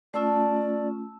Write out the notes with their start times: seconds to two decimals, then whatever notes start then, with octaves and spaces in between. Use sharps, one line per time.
0.14 A3 C#4 F4 D5 A5 E6